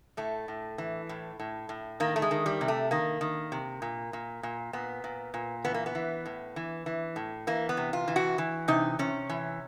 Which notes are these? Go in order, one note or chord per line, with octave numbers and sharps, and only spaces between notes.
A2 A3
A2
E3
A2
A2
A2
D#3 A#3
A3
G#3
D#3
G3
C3
A3
D#3 A#3
D#3
C3
A#2
A#2
A#2
A#2 B3
A#2
A#2
E3 B3
A#3
B3
E3
A2
E3
E3
A2
E3 A#3
B3
C3
F4
E3
F#4
E3
C3 D#4
C3 C#4
E3